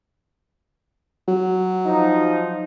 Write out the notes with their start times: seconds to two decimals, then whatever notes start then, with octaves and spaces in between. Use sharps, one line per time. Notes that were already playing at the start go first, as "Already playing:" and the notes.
1.28 F#3
1.86 F3 D#4